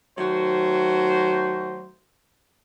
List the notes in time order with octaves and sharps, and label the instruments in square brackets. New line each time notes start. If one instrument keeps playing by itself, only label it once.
[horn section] D#3 F#3 A3 F#4 C5